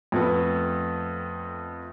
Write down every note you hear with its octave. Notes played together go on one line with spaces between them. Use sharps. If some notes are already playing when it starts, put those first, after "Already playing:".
F2 A3 B3